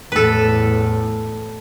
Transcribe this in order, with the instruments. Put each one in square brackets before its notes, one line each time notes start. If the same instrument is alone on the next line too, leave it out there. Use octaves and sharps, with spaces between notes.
[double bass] E2 A2 [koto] A4 B4